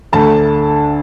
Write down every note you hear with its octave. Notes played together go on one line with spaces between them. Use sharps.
D2 D3 A3 A5